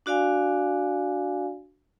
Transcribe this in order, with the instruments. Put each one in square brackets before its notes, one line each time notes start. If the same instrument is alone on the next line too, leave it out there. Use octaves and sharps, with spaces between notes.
[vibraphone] D4 F#4 D5 F5 G#5